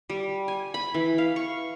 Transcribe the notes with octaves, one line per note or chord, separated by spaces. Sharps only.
G3
G#5
B5
E3
F5
C#6